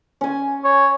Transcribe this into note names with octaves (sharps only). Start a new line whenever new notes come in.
C#4 G#5
C#5